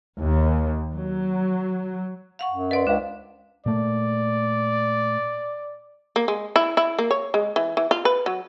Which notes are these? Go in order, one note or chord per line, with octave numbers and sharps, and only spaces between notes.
D#2
F#3
F5 F#5 C#6
F#2
B4 D5 D#5 F#5 C6
C#2 D4 C5 F5
A#2 A3 D5
A#3
G#3
E4
E4
A#3
C#5
G#3
E3
E3
F4
B4
F#3